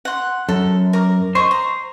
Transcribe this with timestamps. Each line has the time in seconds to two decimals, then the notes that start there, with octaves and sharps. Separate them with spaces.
0.05 F#5 C6
0.49 F#2 A4
0.93 A#4 D6
1.35 C5 D#5 C#6
1.51 A#5